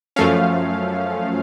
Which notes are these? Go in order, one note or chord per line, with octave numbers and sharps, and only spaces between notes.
F#2 F3 A3 C#4 F5